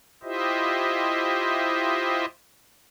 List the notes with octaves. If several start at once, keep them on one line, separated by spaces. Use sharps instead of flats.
E4 F4 G4 C5 D#5 E5